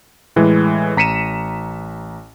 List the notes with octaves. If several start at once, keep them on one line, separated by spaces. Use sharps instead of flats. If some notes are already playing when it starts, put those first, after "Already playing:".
A2 E3 G#3
A1 A#5 B6 C#7 D#7 E7